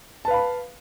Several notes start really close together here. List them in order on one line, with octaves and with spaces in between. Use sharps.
A5 B4 F5 B5